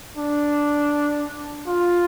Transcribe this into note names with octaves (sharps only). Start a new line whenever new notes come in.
D4
F4